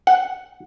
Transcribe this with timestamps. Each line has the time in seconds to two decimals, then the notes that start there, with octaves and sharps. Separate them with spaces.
0.07 F#5